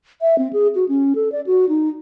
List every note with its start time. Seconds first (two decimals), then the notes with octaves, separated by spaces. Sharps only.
0.21 E5
0.38 C4
0.53 G#4
0.75 F#4
0.89 C#4
1.15 A4
1.32 D5
1.47 F#4
1.69 D#4